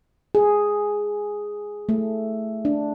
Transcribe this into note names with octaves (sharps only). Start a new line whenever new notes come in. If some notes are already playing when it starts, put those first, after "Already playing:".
G#4
A3
D4